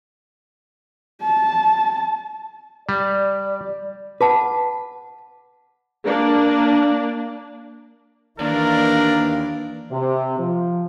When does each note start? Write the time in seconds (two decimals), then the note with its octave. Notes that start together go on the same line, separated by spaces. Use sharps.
1.22 A5
2.89 G3 D5
4.21 B4 F#5 A5 D6
6.06 A#3 D4
8.40 D#2 E3 A#3 D4 A#4 D5
9.92 C3
10.40 F3